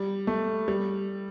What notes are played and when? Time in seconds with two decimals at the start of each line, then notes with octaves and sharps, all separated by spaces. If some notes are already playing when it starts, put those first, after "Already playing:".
Already playing: G3
0.27 A3
0.68 G3